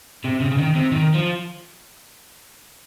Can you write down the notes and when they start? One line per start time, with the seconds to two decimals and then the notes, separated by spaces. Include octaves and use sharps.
0.25 C3
0.40 C#3
0.52 C#3
0.58 D#3
0.75 C3
0.92 D#3
1.14 F3